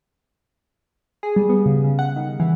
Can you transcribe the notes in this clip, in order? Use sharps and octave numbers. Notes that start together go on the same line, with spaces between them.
G#4
G3
B3
C#3
C#3
F#5
D#3
E3